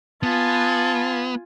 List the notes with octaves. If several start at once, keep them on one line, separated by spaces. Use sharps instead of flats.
B3 F4 G#5 A5